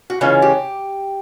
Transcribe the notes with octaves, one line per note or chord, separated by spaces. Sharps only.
F#4
C#3 E3 G#3 C#4 F4
G4